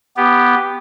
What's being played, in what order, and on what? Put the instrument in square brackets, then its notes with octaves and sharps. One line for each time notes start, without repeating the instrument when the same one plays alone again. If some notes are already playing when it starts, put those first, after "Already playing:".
[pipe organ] B3 G4